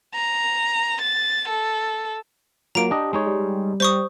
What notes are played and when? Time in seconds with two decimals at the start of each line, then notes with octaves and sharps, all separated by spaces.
0.15 A#5
1.02 A6
1.48 A4
2.75 F#3 A#3 F4 A#5 D7
2.91 D4 G4 D#5
3.13 G#3 D#4 C#5
3.26 G3
3.80 G3 C5 C#6 D#6